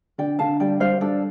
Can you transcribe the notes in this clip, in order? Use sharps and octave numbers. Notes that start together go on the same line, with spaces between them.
D3 D5 G5
D3 F5 A5
G3 D5 G5
G3 C5 F5
D4 A4 D5